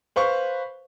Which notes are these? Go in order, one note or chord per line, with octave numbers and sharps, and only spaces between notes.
B4 C5 F5 C#6